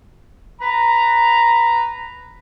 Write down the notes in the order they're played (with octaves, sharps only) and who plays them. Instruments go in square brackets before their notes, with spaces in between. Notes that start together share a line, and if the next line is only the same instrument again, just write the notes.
[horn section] B4 A#5